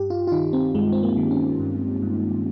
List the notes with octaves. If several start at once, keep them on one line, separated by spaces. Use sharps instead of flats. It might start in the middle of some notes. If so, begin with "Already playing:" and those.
Already playing: G2 G4
F4
F4
D#3 D#4
C4
G2 G#3
C4
A#3
D#3
C#4
G2
G2